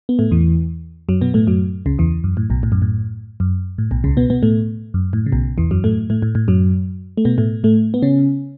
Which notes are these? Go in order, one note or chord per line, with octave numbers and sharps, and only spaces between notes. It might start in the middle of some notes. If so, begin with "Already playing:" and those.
B3
A2 A3
E2 E3
F#2 F#3
B2 B3
A2 A3
F#2 F#3
C#2 C#3
E2 E3
F#2
A2
B1 B2
A2
F#2
A2
F#2
A2
B1 B2
C#2 C#3
B2 B3
B2 B3
A2 A3
F#2
A2
C#3
B1 B2
E2 E3
F#2 F#3
A2 A3
A2 A3
A2
A2
F#2 F#3
A3
B2 B3
A2 A3
A2 A3
B3
C#3 C#4